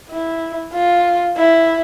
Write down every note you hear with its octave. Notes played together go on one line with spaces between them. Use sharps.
E4
F4
E4